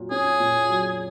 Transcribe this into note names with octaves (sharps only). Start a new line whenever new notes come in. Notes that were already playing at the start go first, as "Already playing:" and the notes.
Already playing: A#2 F#3 F#4
C#4 G#4
A#2
F#3